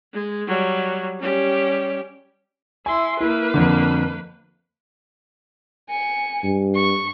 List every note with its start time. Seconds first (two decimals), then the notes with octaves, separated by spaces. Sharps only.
0.13 G#3
0.47 F#3 G3
1.21 G3 C#4 G4
2.86 E4 G#5 C6
3.21 A#3 E4 B4
3.54 F2 D3
5.90 G#5 C#7
6.43 G2
6.76 C#6